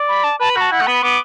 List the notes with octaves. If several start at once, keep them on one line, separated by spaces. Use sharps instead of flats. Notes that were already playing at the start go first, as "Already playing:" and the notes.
Already playing: D5
B5
A5
B4 A5
B5
F#4 A5
E4 F#5
A3
B3 B5
B3 D6